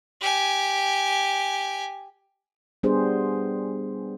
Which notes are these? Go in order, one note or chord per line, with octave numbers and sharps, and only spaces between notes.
G4 G#5
G3 B3 D4 G4 G#4 C5